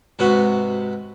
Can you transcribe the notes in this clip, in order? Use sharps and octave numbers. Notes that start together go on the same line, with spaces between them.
G#2 C3 B3 F#4